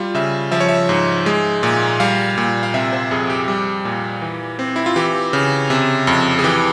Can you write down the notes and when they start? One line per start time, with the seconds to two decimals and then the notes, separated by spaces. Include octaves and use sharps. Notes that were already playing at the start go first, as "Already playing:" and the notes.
Already playing: G3 F4
0.15 C#3 E5
0.52 F3 E5
0.60 C#5
0.69 E5
0.89 G#2
1.26 G#3
1.63 A#2
2.00 G3 F5
2.38 A#2
2.63 F5
2.74 C3 E5
2.92 C5
3.11 F2 G#4
3.30 G4
3.48 G3
3.85 A#2
4.22 E3
4.59 C4
4.76 E4
4.86 F4
4.96 E3 G4
5.33 C#3
5.70 C3
6.07 F2
6.39 G#4
6.44 E3 G4